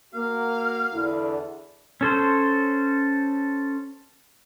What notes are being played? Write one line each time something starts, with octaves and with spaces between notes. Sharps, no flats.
A#3 F#4 F5
E2 D3 E4
C#4 A4 C5